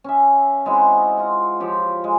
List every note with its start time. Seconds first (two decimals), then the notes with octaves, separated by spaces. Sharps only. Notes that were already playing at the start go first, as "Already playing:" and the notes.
0.04 C#4 E5
0.66 G#3 C4 E4 F#4
0.97 D#5
1.17 F4 F#5
1.60 F3 G4 C#5
2.04 G#3